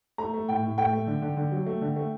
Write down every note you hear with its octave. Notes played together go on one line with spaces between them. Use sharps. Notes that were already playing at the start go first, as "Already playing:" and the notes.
A3 A#5
A3
A2 G5
A2
A3 G5
A3
D3
D3
D3
F#3
A3
D3
A3